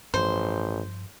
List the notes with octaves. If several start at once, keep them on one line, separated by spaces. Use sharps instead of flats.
A1 G2 F3 C5